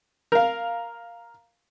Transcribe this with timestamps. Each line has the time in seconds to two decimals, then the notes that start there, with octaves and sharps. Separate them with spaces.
0.32 A#4 F5